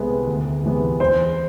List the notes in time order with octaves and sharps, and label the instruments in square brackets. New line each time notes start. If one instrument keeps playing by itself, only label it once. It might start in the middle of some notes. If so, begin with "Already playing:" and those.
Already playing: [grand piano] C2 C3 G#3 B3
D2
C3 E3 G#3 B3
[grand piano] E2 [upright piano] C5